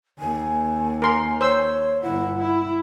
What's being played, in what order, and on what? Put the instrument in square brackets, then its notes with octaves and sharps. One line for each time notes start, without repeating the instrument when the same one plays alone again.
[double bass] D#2 [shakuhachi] G#5
[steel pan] A#4 C6
[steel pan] C5 E6 [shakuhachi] C#5
[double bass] G1 E4 [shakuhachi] F#5
[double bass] E4